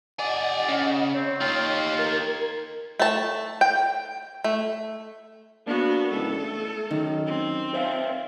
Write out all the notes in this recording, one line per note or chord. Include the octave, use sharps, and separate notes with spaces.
G4 D5 D#5 F#5 G#5
C#3
C4 C#5
D#4 F4 G4
A#4 G#6
A3 A5
G5
A3
A#3 B3 D4 F#4
G#2 C#3 E3 A4
A3
F#2 D#3
C4
C5 E5 F5